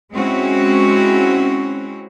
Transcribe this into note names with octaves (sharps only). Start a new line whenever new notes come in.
G#3 C4 C#4 E4 F#4